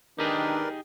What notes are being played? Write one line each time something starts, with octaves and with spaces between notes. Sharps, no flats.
D#3 D4 D#4 G4 G#4 A#4 B4 D5